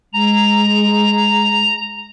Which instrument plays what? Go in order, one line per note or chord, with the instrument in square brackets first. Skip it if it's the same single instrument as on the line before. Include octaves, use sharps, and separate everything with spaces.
[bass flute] G#3 [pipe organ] A#5